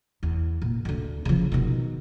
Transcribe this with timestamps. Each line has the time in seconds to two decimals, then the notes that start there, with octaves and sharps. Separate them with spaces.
0.23 E2
0.62 A#2
0.85 D2 D3
1.25 C#3 F3
1.52 B2 D#3